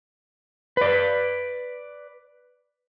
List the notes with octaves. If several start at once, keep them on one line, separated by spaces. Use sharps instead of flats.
B4 D5